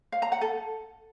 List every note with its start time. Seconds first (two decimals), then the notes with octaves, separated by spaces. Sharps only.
0.12 F5
0.22 A#5
0.32 F#5
0.41 A4